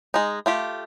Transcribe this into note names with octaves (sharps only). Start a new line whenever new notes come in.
G#3 D#4
A3 F4 G4